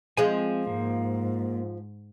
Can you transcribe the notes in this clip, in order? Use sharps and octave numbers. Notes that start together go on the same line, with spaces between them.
F3 G#3 C4 G#5
G#2 A#3